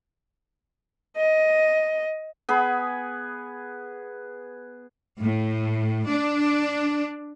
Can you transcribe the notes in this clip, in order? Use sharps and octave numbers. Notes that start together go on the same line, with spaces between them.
D#5
B3 G#4 B5
A2
D4